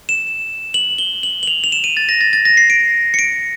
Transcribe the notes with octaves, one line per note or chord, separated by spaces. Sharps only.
E7
F#7
G7
F#7
F#7
F7
F7
E7
D#7
A6
A#6
A6
A6
A#6
C7
D7
C#7
D7